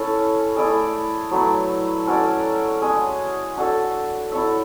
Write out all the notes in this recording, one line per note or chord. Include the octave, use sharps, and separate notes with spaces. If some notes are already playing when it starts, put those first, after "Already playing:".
Already playing: C#4 E4 A4 C#5
A3 E4 G#4 D5
F#3 A3 E4 B4
C#4 F#4 A4 D5
G#3 C#4 G#4
D4 F#4 A4
E4 A4 C#5 E5